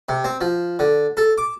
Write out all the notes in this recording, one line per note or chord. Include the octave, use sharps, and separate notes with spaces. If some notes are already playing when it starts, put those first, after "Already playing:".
C3
C4
F3
D3
A4
D6